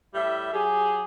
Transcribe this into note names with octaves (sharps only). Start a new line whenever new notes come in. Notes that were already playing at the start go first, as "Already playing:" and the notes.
A2 G3 E5
F#3 G4 G#4